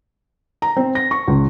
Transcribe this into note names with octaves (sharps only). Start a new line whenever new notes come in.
A#5
C4
A#6
C#6
C#2